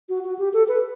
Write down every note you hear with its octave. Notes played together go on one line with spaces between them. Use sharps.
F#4
F#4
G4
A4
B4